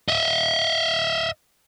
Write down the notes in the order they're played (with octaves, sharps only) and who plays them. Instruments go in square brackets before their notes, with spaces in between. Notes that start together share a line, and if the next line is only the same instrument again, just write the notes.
[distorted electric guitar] D#5 E5